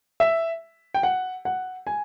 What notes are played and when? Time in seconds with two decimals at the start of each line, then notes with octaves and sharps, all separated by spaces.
0.20 E5
0.94 G5
1.03 F#5
1.45 F#5
1.87 G#5